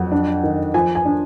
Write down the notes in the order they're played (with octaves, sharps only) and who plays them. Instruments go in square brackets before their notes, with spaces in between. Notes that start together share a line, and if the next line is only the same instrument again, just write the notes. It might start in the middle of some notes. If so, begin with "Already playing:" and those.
Already playing: [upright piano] F2 F#3 F#5
D4
D#3
F3 G#5
G#5
D4